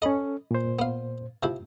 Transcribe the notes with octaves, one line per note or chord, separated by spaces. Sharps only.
C#4 A4 D#5 B5
A#2 C5
B3 F5
C3 F3 E4